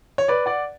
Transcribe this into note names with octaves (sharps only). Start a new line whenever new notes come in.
C#5
B4 D5
D5 F#5